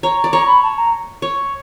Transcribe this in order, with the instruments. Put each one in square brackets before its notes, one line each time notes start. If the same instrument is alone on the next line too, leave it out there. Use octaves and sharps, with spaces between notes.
[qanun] C#5 [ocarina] A#5
[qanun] D5
[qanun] C#5 [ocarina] A#5
[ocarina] B5
A5
A#5
[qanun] C#5